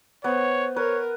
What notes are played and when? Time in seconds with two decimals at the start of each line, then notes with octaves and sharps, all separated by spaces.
0.24 B3 C5 C#5
0.76 A#4 B4 C#5